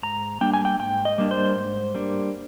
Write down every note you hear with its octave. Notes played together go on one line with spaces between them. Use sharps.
G#2 A#5
G3 A#3 D4 G5
G#5
G5
G#2 G5
D#5
G3 A#3 D4
C5
G#2
G3 A#3 D4